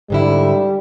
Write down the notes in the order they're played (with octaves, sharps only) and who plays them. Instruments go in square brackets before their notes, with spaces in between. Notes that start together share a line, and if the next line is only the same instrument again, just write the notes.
[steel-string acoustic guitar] G#2 D3 E4 [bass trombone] G3